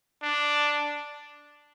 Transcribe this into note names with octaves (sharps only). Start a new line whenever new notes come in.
D4